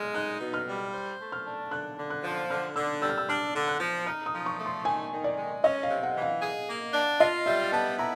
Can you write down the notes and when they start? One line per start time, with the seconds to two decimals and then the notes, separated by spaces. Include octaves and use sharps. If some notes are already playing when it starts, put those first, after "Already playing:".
Already playing: G#3 F6
0.14 D#4 F#6
0.40 B2
0.54 F6
0.67 G3
0.94 C5
1.19 A3
1.32 F6
1.46 D4
1.71 D3 F#6
1.98 D3
2.10 F#6
2.24 F3
2.49 D3 F6
2.75 D3 E6
3.02 G3 E6
3.09 F6
3.18 E6
3.28 D4 F6
3.55 D3
3.68 F#6
3.80 F3
4.06 D#4 F6
4.26 D#6
4.32 F3
4.46 C#6
4.59 A3
4.66 C6
4.85 D#3 G#5
5.11 D#3
5.24 D5
5.38 G#3
5.63 C#4 D#5
5.83 F5
5.90 C3
6.03 F#5
6.15 E3
6.22 F5
6.41 G#4
6.68 A#3
6.94 D4
7.20 F4 D#5
7.46 G3 E5
7.72 B3 A5
7.99 E4 A#5